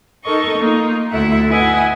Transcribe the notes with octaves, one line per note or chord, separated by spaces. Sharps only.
D#4 A4 A#4 D#5 C#6
A#3 D#4 F4
D2 E4 A4 E5 F#5
E4 B4 D#5 F#5 G#5